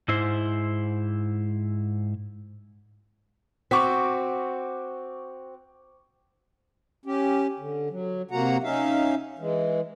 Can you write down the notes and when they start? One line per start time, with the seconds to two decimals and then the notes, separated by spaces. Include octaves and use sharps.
0.08 G#2 E4 C5
3.71 C4 F#4 C#6 D6 B6
7.06 C#4 G4
7.59 D3
7.90 F#3
8.31 C3 A#3 F#4 F#5 A#5
8.63 C#4 D#4 E5 F5
9.39 E3 G#3